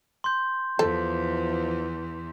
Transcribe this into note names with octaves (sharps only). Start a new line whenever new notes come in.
C6 G6
E2 E3 F3 A4